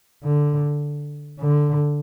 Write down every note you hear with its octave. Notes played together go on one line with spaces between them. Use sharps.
D3
D3